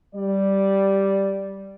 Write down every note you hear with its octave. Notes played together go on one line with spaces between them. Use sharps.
G3 D5